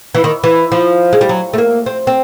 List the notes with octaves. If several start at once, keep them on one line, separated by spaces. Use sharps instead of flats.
E3
D#3
E3
F3
G#3
G3
F#3
A3
A#3
C4
C4